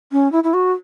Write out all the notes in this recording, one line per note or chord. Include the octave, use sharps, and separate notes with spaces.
C#4
E4
E4
F#4